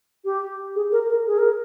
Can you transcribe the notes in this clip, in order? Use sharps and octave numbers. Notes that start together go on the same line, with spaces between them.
G4
G#4
A#4
A#4
G#4
A#4